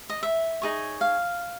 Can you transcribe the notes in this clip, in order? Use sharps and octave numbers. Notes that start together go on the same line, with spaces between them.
D#5
E5
D#4 G#4 C#5
F5